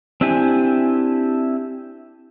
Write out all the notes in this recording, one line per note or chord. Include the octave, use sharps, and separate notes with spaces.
C4 D4 E4 G4 G#5